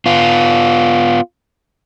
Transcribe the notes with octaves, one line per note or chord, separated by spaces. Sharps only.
B3 F4